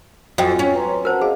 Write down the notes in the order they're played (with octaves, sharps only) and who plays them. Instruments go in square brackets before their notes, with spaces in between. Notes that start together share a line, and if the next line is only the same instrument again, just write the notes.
[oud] F2 [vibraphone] F#3 F4 G#5 [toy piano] F#4 D#5 G5
[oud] C#4
[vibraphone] B4 A#5 C6
[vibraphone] F#4 F#5 A5 [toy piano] A#4 C5
[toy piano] G#4 [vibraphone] C5 D#5 F5